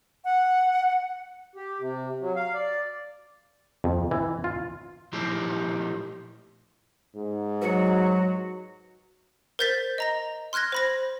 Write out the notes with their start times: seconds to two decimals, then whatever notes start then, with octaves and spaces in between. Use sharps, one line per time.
0.25 F#5
1.56 G4
1.79 C3
2.20 F#3
2.36 F5
2.54 D5
3.84 F2
4.11 E3
4.44 F4
5.13 A#2 F3 A3 D#4 E4 G4
7.16 G#2
7.61 F#3 F#4 B4 D#5 C#7
9.59 A#4 C5 G6 A6 B6
9.98 D#5 A#5 A#6
10.53 C6 F6 F#6 G#6 A#6
10.72 C5 B5 A#6